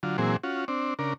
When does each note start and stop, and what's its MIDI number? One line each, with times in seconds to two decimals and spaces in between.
0.03 0.17 50
0.03 0.17 54
0.03 0.17 65
0.18 0.37 46
0.18 0.37 52
0.18 0.37 54
0.18 0.37 60
0.18 0.37 68
0.43 0.65 61
0.43 0.65 65
0.43 0.65 66
0.68 0.94 60
0.68 0.94 62
0.99 1.13 49
0.99 1.13 62
0.99 1.13 70